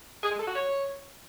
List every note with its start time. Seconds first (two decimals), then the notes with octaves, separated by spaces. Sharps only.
0.23 G#4
0.31 G#3
0.39 A4
0.47 F#4
0.55 C#5